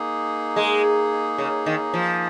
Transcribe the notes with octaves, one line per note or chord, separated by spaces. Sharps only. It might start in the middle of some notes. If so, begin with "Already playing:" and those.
Already playing: A#3 D#4 G#4
G#3
C#3
D#3
F3